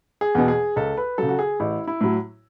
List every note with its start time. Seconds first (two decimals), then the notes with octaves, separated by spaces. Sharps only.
0.21 G#4
0.35 E2 B2
0.48 G#4
0.76 C#2 A4
0.97 B4
1.18 C#3 F#3 A4
1.29 F#4
1.39 G#4
1.60 A1 E4
1.87 E4
2.01 A2 F#3